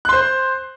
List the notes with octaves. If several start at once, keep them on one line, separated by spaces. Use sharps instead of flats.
C5 C6 F#6